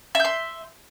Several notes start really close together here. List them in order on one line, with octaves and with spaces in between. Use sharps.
E5 G6 C6